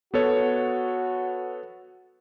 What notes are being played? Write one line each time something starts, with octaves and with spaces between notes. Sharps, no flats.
B3 F#4 A4 C#5